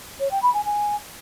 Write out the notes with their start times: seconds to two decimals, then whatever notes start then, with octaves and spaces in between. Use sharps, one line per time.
0.20 C#5
0.31 G5
0.42 B5
0.54 G#5
0.65 G#5